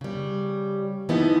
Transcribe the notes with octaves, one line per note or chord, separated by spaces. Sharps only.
C#3 G3
E3 F3 B3 D#4